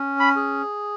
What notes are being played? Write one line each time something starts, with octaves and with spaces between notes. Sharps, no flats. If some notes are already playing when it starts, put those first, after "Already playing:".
Already playing: C#4
B5
G#4